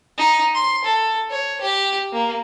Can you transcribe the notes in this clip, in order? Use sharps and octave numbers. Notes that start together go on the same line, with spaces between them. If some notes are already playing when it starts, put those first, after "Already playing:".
D#4
C6
A4
C#5
G4
A#3